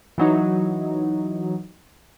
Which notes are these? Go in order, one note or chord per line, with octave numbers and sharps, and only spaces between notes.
E3 F#3 D#4